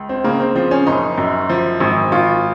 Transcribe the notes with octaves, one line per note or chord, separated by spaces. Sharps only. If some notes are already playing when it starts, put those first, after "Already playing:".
Already playing: C#2
C4
C#3 A#3
C4
F3 C4
C#4
F#1 D#4
F#2
F3
G#1
G#1 F4